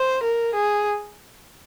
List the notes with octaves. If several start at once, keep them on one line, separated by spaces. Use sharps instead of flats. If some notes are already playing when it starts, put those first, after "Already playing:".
Already playing: C5
A#4
G#4